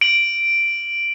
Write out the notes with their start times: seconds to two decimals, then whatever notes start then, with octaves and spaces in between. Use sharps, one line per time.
0.01 D7 F#7